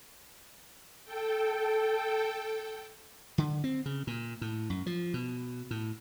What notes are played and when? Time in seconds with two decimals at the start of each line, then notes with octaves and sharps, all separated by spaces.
1.04 A4 G5
3.38 D3
3.64 C4
3.86 C#3
4.07 A#2
4.41 A2
4.70 F#2
4.86 F3
5.14 B2
5.71 A2